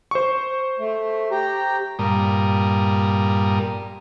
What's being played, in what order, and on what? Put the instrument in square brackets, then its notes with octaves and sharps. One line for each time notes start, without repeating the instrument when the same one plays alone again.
[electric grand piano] C5 C#6
[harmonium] A3
G4 G5 A#5
[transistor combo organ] G2 A#2 G3 A#4 D#6